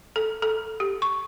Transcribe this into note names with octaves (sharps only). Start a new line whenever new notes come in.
A4
A4
G4
C#6